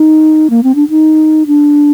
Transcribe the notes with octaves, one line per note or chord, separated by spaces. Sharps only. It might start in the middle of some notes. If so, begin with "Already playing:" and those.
Already playing: D#4
A#3
C4
D4
D#4
D4